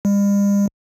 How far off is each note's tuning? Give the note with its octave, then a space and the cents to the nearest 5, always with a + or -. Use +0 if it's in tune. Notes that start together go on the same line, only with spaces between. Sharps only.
G3 +45